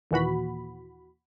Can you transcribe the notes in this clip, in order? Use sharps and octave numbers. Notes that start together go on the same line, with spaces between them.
D#2 A#2 E3 F#4 B5